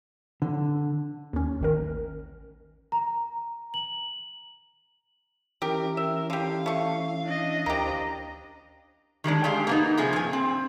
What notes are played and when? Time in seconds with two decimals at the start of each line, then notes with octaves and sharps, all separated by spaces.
0.42 D3
1.33 D#2 C#4
1.61 A1 D#3 A#4
2.92 A#5
3.74 F#7
5.62 E3 C#4 E4 G4 A#4
5.97 A#4 E5
6.30 D3 G4 F5
6.66 A3 C#6
7.24 D4 D#5
7.66 D2 A#3 G4 C5 A#5
9.24 D#3 G3 G#3 D4
9.44 G#3 G4 G#4 F5
9.67 A#3 B3 D#4
9.97 C3 F3 G#4
10.13 G2 G#5
10.33 C4